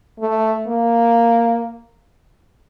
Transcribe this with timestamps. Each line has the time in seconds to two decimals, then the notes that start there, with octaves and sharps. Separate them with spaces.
0.20 A3
0.68 A#3